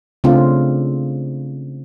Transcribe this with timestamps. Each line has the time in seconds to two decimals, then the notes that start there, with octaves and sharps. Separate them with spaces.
0.24 C#3 A3 C4 D4 F4